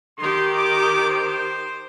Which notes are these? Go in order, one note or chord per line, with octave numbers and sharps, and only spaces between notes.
D#3 G4 C6
D6
C5